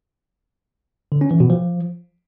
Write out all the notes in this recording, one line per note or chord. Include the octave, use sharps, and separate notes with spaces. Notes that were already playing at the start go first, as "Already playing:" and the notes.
D3
C#4
E3
B2
F3